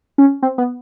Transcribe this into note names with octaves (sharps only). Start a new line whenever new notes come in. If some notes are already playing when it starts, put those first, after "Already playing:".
C#4
C4
B3